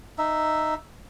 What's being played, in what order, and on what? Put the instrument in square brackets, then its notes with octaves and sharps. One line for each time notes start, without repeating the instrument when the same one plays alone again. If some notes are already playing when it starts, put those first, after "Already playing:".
[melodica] D#4 E5